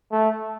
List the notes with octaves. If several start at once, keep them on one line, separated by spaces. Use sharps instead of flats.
A3